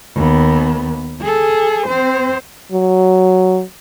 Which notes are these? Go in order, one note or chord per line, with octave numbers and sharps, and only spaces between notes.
D#2 B3
G#4 A4
C4 C5
F#3